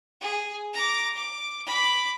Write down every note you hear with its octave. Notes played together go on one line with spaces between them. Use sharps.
G#4
A#5 D6
D6
B5 D6